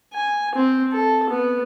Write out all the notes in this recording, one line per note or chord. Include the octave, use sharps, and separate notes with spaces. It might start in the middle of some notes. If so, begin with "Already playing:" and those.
G#5
C4
A4
B3